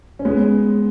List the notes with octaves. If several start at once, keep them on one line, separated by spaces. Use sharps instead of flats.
C#4
G#3 B3